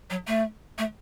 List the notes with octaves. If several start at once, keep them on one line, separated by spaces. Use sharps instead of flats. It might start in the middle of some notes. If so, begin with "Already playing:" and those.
F#3
A3
A3